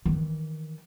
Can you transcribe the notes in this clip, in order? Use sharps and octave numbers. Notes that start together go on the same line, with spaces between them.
D#3 E3